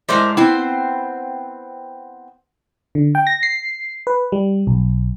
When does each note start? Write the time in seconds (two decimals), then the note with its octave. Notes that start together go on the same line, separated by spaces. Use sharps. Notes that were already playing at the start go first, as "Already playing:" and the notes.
0.09 A2 G#3 A#4 C5 D5 E5
0.37 B3 C4 E4 C5
2.95 D3
3.15 G5
3.27 A#6
3.43 C7
4.07 B4
4.32 G3
4.67 B1